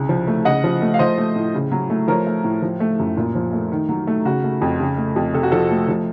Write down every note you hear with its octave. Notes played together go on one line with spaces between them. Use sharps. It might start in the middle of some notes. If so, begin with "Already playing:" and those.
Already playing: C2 C#3
F3
A3
C#3 D#5 F#5
F3
A3
F5
F3 C5 D#5
A3
A2
C#3
F#3
A3
F3 A#4 C#5
A3
A2
F3
A3
F#2
A#2
F3
A3
D#3
F#3
A3
C#3 F#4
A3
F2
C#3
A3
F2
C3 A4
F#4
F3 A4
A3
F3